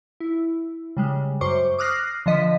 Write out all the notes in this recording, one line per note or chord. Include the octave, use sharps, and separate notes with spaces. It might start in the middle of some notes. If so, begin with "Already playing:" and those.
E4
C#3 G3 G#3
F#2 C5 C#6 D6
D6 D#6 F6 F#6 A#6 C7
D3 F3 D#5 B6